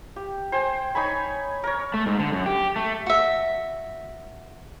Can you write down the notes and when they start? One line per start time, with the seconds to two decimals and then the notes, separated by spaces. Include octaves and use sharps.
0.16 G4
0.52 C5 G5 G#5
0.95 D#4 C#5 G#5 B5
1.64 A#4 C#5
1.94 A3
2.06 G#2
2.19 D3
2.32 F#2
2.46 G4
2.76 A3
3.07 F#4 E5